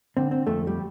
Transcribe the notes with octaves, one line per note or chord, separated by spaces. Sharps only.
D3 C4
C4
F2 A3
G3